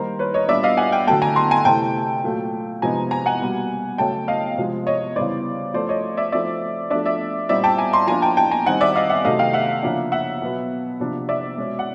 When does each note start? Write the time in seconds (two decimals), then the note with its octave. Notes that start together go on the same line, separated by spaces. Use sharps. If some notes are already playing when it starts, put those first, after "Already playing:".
Already playing: D#3 G3 A#3 D#4 A#4 C5
0.19 B4 C#5
0.34 C#5 D#5
0.49 A#2 G3 B3 D4 D5 E5
0.63 D#5 F5
0.77 F#5 G#5
0.92 F5 G5
1.07 D3 F#3 A3 G5 A5
1.22 G#5 A#5
1.36 A#5 C6
1.51 G#5 A#5
1.65 C3 E3 A3 G5 A5
2.24 A#2 F#3 A3
2.82 C3 F3 G#3 B3 D#4 G#5 A#5
3.11 G#5 A#5
3.26 F#5 G#5
3.41 B2 G3 A#3
3.98 C#3 F#3 A3 C#4 G5 A5
4.28 D#5 F5
4.57 C3 F3 G#3
4.87 C#5 D#5
5.16 C#3 E3 G3 B3 D#4 C5 D5
5.74 F3 A3 C#4 C5 D5
5.89 C#5 D#5
6.17 D5 E5
6.32 F3 A3 C4 D#4 D5 E5
6.90 F3 A3 D4 D5 E5
7.06 D5 E5
7.49 A#2 G3 C4 D#4 D5 E5
7.64 G5 A5
7.78 G#5 A#5
7.93 A#5 C6
8.07 F3 A#3 D4 G#5 A#5
8.22 G5 A5
8.37 G5 A5
8.51 G#5 A#5
8.66 D#3 G3 C4 D#4 F#5 G#5
8.81 D5 E5
8.96 D#5 F5
9.09 E5 F#5
9.25 C3 D#3 F#3 A3 D#5 F5
9.39 F5 G5
9.53 E5 F#5
9.83 C#3 F3 A#3 D4
10.12 E5 F#5
10.42 B2 F#3 B3
11.00 C3 F3 A#3 D4
11.29 D5 E5
11.58 B2 G#3 C#4
11.79 F#5